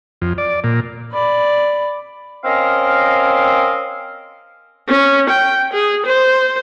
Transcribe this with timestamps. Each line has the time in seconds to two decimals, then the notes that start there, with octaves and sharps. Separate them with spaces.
0.22 F2
0.38 D5
0.64 A#2
1.12 D5 B5
2.44 C4 C#4 A#4 D#5 F5
4.88 C#4
5.30 G5
5.73 G#4
6.06 C5